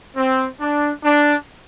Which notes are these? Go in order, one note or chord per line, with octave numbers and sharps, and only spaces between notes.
C4
D4
D4